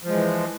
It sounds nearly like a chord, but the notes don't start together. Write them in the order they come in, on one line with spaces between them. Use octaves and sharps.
F3 G#3 E3